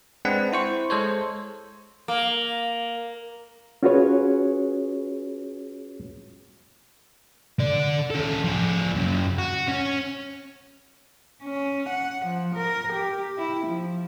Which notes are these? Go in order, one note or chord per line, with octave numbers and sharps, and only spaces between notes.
G#3 C4 D4 B4 F#5
E4 C5 C#6
G#3 A4 C5 C#5
A#3
C#4 F4 F#4 G#4 B4 C#5
D3 D5
C#4 A4
F3 G#4
F#2 C#3
F#4
C#4 C#5
C#4
F#5
F3
A#4
G4
E4
F3